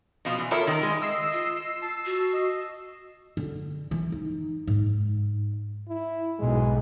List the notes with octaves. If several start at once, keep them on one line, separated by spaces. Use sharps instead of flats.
B2 F3 F5
E3
E4 F4 A4 A#4 C#5 E5
D#3 A#4
G#3
D#5 E6 C7
F4
A5
F#4
D#5
D3
E3
D#4
G#2
E4
B1 G#2 G#3